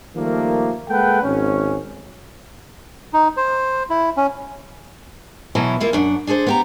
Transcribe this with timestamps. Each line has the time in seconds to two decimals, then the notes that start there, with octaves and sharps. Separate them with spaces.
0.16 D#3 F3 G3 A3 A#3
0.89 G#3 A#3 A4 B4 F#5 G5
1.23 G#1 C#4
3.13 D#4
3.37 C5
3.90 E4
4.17 C#4
5.55 B2 E3 F#3 E4 A4
5.80 A#3 E4 F4
5.93 F#2 D4 F#5
6.27 D4 G#4 A4 C5
6.47 B3 G4 A#5